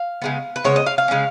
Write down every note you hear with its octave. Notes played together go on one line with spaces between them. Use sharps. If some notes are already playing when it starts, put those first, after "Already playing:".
Already playing: F5
C#3 G#3 B3
B4
C#3 G#3 B3 C#5
D#5
F5
F5
C#3 G#3 C#4